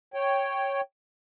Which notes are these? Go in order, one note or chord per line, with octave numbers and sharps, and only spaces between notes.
C#5 G5